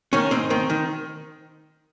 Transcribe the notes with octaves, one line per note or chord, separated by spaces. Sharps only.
D#3 C#4
G#2 C4
D#3 C4
D#3